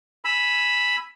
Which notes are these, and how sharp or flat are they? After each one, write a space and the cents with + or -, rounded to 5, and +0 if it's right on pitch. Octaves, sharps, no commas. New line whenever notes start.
G#5 +0 B5 +0 E6 +10